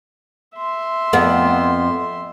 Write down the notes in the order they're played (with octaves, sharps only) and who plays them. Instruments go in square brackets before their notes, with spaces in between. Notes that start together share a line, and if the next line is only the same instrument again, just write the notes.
[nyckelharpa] E5 C6
[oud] F2 B3